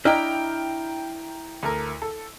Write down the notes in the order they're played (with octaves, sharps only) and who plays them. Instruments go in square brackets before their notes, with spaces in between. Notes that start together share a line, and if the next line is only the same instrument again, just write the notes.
[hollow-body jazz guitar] D4 E4 D#5 [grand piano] G5 A#5 F6
[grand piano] D2 A4 A#4
A4